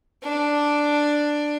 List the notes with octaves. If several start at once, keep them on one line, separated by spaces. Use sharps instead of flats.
D4